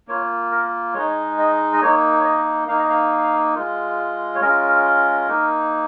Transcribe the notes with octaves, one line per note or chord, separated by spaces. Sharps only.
A#3 F4 C#5
A#4
G#3 D#4 C#5
D#5
D#5
A#3 D#4 C#5
C#5
D#5
A#3 D#4 F5
D#5
F5
G#3 F4
C#5
G#3 C#4 F4 A#4
A#3 D#4